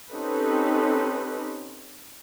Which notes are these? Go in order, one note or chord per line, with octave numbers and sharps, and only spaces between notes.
C4 C#4 D#4 G4 A4 B4